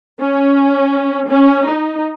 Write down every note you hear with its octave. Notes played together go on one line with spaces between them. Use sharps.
C#4
C#4
D#4